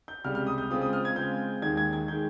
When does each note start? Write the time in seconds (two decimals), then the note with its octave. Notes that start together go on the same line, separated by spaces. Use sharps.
0.08 G6
0.24 C#2 C3 G3 F6
0.35 F6
0.47 D#6
0.58 G6
0.71 C#3 G#3 C4 F4 D#6
0.82 D#6
0.93 F6
1.05 G#6
1.15 C#3 G#3 C4 F4 G6
1.62 D#2 D#3 G#3 G#6
1.77 G#6
1.93 G#6
2.08 D#3 G#3 G6